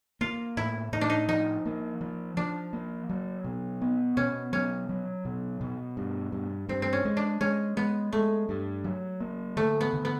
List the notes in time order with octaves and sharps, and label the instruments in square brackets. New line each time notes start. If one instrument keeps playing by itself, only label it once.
[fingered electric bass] A#3 [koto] F4
[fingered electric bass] A2 [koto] E4
[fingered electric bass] A2 [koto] D#4
[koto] D4
D#4
[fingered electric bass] F3 [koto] D#4
[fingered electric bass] A#3
F3
[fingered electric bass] F3 [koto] D4
[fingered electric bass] A#3
F#3
B2
B3
[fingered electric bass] B2 [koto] C#4
[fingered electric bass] F#3 [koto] C#4
[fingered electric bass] F#3
B2
B2
G2
G2
[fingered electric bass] G2 [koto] C4
[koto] C4
C#4
[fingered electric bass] G#3
[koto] D4
[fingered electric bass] G#3 [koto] C#4
[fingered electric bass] G#3 [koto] B3
[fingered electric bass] G#3 [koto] A3
[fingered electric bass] G2
F#3
A#3
[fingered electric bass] D3 [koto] A3
[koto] B3
[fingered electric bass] D3
[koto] B3